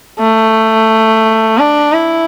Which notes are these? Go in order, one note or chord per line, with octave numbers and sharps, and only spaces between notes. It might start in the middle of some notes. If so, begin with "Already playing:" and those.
A3
D4
E4